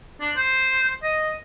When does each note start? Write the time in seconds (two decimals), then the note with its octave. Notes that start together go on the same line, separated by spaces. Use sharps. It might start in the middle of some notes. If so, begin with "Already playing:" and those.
0.21 D4
0.37 C5
1.03 D#5